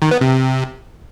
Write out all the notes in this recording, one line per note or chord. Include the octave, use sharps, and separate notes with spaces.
D#3
B3
C3